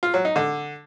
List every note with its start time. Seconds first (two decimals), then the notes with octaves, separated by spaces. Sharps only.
0.03 F4
0.14 F#3
0.25 D#4
0.36 D3